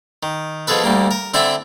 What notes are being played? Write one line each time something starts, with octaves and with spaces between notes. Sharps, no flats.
D#3
B2 F3 G#4 A4 B4
D2 G3 A#3
A#4
D3 C4 E4 D5 E5 B5